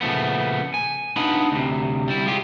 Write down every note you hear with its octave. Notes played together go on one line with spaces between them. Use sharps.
A#2 C#3 F3 A3 B3
G#5
B3 D4 D#4 F4 B4 B5
D2 C3
G3 E4
G#3 F4 G4